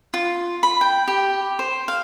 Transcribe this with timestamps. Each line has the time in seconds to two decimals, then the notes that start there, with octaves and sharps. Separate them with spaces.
0.14 F4
0.63 B5
0.81 G5
1.08 G4
1.59 C5
1.88 F5